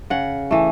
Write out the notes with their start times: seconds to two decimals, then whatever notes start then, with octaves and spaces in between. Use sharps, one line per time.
0.10 C#3 F#5
0.51 E3 A3